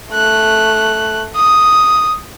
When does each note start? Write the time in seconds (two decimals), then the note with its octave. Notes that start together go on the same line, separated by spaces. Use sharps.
0.11 A3 F#6
1.35 D#6